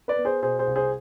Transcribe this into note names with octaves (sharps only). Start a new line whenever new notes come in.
B4 D5
B3
G#4 C5
B2 G#4 C5
G#4 C5
C2
G#4 C5